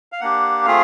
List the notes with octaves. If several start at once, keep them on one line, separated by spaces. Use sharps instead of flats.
F5
A#3 D4 G4 F#5
A3 C4 F4 G#4 F5